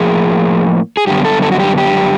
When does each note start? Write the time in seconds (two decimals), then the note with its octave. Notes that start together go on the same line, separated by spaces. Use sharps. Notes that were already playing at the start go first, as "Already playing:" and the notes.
Already playing: A2 F3 A#3 G#4
0.97 G#4
1.07 F#2 D3 G3 B3 G4
1.25 A4
1.42 A4
1.52 F#4
1.60 G4
1.78 G4